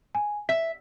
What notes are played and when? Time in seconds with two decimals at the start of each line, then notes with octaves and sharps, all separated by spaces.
0.15 G#5
0.49 E5 B6